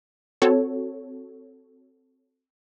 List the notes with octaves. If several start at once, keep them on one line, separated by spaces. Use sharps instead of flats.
C4 F#4 A4 C#5